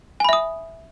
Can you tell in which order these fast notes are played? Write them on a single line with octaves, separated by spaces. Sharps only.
G#5 B5 E5 D#6